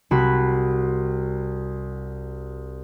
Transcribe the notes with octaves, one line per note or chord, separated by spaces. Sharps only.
C2 F#4 B5